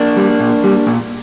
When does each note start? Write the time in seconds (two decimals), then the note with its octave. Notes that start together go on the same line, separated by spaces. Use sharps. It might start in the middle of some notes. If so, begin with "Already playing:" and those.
Already playing: A#3 D4
0.17 G3
0.40 A#2
0.64 G3
0.87 A#2